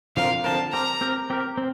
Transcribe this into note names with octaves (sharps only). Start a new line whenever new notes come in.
D3 F3 C4 F4 A#4 F5
D3 F3 C4 F4 A#4 A5
C4 G4 A#4 A#5
C4 G4 A#4
C4 G4 A#4
C4